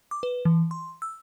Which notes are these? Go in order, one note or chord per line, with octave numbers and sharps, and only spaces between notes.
D6
B4
E3
C6
E6